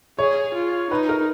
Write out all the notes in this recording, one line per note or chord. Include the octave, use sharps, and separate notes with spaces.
G#4 C#5
F4
D#4 B4
A#4